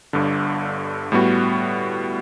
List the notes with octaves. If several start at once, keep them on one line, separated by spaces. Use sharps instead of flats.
G1 G2 D3
A2 G3 B3 F#4